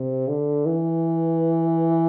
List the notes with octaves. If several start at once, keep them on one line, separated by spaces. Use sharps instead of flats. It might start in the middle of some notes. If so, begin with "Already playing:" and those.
Already playing: C3
D3
E3